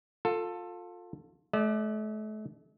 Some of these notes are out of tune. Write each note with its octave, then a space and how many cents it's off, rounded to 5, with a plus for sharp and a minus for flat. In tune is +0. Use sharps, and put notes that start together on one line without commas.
F4 +25 A4 +15
A3 -40 D5 +20